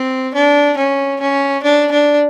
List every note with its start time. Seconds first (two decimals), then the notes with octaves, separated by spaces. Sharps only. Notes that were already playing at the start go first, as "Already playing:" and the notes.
Already playing: C4
0.35 D4
0.78 C#4
1.21 C#4
1.63 D4
1.92 D4